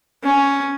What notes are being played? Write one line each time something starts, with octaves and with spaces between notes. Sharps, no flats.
C#4